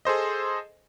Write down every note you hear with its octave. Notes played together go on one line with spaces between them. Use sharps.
G#4 A4 C5 D#5